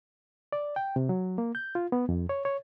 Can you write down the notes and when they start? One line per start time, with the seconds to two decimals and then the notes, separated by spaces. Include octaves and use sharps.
0.53 D5
0.76 G5
0.96 C3
1.09 F#3
1.38 A#3
1.55 G6
1.75 F4
1.92 B3
2.09 F2
2.29 C#5
2.45 C#5